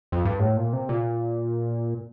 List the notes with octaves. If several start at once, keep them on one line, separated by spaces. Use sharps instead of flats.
F2
G2
A2
A#2
C3
A#2